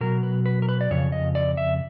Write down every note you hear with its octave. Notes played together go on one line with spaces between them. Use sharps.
B2 F#3 A#4
B4
B4
A#4
B4
D5
F2 C#3 C#5
D#5
D5
E5